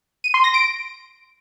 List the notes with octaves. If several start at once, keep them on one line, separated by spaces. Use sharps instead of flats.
D#7
C6
A#6
D7